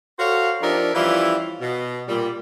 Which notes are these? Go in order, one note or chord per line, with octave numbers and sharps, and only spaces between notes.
F#4 A4 C5 C#5 F5
F3 D4 D#4 G4 A#4 E5
E3 F3 G3 C#4 E4 F4
B2
A#2 G3